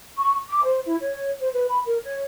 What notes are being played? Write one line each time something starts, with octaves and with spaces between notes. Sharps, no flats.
C#6
D6
C5
E4
C#5
C5
B4
B5
A#4
C#5